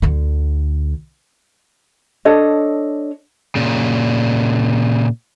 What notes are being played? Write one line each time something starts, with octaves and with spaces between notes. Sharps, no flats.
D2 D3
D4 A4 C#5 D#5
A#2 C#3